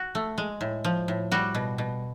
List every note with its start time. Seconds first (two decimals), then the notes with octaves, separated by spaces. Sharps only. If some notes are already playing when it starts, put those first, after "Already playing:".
Already playing: F#4
0.15 A3
0.38 G#3
0.61 A2
0.84 F3
1.08 A2
1.32 G3 F#4
1.55 B2
1.78 B2